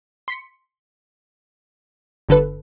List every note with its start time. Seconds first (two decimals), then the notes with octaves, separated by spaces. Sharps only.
0.28 C6 B6 C#7
2.29 G1 D3 A4 B4